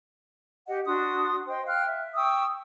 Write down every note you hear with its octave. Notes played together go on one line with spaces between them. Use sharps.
G4 D#5 F#5
D4 F#4 C6 D#6
C5 D#5 G5 C6
F5 G5 F6 F#6
E5
G5 C#6 D#6 E6